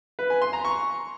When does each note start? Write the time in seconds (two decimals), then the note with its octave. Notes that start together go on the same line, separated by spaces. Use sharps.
0.19 B4
0.30 G#5
0.42 C6
0.53 A#5
0.64 C#6